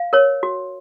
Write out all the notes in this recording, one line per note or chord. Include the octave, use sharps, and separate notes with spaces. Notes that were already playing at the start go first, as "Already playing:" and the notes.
Already playing: F5
A#4 C#5
F#4